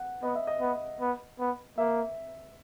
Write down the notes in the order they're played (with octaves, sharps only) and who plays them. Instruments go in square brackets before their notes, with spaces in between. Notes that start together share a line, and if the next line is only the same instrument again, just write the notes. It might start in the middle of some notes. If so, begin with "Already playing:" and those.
Already playing: [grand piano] F#5
[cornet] B3 [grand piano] D#5
[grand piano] E5
D#5
[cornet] B3
B3
B3
[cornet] A#3 [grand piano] E5